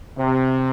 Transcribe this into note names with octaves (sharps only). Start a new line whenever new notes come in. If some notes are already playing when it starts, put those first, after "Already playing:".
C3